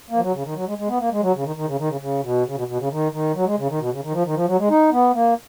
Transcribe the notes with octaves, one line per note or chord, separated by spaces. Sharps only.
A#3
F3
F#3
C#3
D#3
F#3
G#3
G#3
B3
A#3
G#3
F#3
C#3
D#3
D#3
C#3
D#3
C#3
C#3
B2
C#3
B2
B2
C#3
D#3
D#3
F#3
G#3
C#3
D#3
B2
C#3
D#3
F3
D#3
F3
F#3
G#3
D#4
B3
A#3